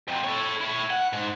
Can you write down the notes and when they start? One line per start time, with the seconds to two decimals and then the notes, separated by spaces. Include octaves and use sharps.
0.08 F2 C3
0.24 A4 C#5
0.61 E4 C#5
0.90 F#5
1.13 G#2